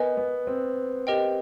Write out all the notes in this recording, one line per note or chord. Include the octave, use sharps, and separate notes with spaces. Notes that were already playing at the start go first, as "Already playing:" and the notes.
Already playing: B3 A#4 D#5 G#5
B3
C4
G4 A#4 D#5 G5